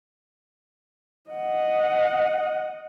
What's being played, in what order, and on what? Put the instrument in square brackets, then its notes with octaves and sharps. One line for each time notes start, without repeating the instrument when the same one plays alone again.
[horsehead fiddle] D#5 F#5